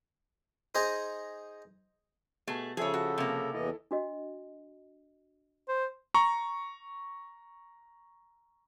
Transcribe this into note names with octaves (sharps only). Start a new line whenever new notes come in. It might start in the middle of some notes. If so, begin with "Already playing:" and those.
D#4 G#4 C5 D#5 A#5
B2 A3 G#4 A5
C#3 F3 G#4 A4 C#5 E5
F#4
C3 A#3
E2 E3 E4 A4 D#5
D4 F#4 D#5
C5
A#5 C#6